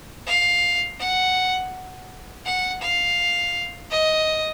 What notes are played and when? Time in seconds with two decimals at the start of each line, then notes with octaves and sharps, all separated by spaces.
0.27 F5
1.00 F#5
2.46 F#5
2.82 F5
3.91 D#5